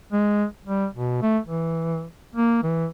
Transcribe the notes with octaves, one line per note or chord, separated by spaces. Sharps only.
G#3
G3
B2
A3
E3
A#3
E3